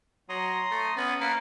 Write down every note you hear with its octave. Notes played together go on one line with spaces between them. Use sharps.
F#3 A#5 C6 D#6
A3
B3 C#4
A#3 F5 F#5 B5